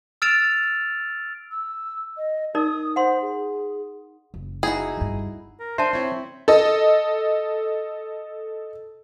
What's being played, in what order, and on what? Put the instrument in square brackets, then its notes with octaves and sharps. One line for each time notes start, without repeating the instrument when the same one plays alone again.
[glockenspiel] E6 F6 A6 D7 E7 F7
[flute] E6
D#5
[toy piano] D#4 A#4 D5 [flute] D#6
[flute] C5 [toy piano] F#5 C6
[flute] G#4
[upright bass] F#1
[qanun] D#4 E4 F#4 [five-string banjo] G#4
[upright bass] G1 G2
[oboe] A#4
[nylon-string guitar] D4 [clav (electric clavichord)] C5 [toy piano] E5 A5 [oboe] C6
[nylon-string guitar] C4 E4 [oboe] C#5
[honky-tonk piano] A4 D#5